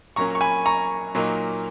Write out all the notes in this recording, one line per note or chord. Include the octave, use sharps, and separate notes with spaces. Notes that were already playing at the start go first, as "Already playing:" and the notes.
A#2 F#3 A#3 C#4 A#5 C#6
C#6
G#5 B5
A#5 C#6
A#2 F#3 A#3 D#4